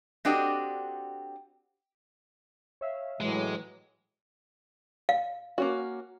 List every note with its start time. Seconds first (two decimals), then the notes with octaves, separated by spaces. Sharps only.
0.25 C4 D4 F#4 G4 A4 D#5
2.81 C#5 E5 F5
3.21 A2 E3 F#3 G#3
5.09 F5
5.58 A#3 C#4 F#4